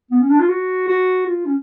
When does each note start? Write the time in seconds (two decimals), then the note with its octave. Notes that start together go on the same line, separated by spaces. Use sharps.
0.11 B3
0.20 C#4
0.30 D4
0.39 F4
0.49 F#4
0.88 F#4
1.26 F4
1.46 C#4